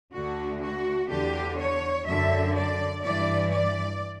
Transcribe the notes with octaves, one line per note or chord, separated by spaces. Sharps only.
D2 D3 F#4
F#4
E2 D3 G4
C#5
F#2 D3 E5
D5
G2 E3 D5
D5